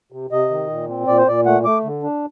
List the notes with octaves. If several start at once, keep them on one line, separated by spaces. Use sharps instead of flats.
C3
C3 D#5
D#3
A#2
C4
A#2 D5
C5
A#2 D5
A3 F#5
A3 D6
D3
D4